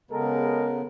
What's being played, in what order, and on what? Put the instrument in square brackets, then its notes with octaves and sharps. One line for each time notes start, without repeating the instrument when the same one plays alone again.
[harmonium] C#3 B3 [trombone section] G#3 A4 A#4